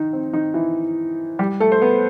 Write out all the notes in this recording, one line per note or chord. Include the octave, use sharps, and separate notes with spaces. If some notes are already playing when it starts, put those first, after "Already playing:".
Already playing: D#3 D#4
C4
D#3 D#4
E3 E4
G3 G4
A3 A4
C5
B3 B4